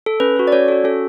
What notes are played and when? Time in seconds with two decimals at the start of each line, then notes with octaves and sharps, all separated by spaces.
0.06 A4
0.20 C#4 B4
0.36 F#4 A4
0.47 D5
0.52 C#4 C#5
0.68 F#4 A4
0.84 C#4 A4